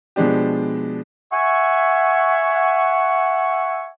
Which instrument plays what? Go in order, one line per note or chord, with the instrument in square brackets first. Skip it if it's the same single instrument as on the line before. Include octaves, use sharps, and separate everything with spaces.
[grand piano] B2 F3 G#3 D4 G4
[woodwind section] E5 F#5 G#5 C#6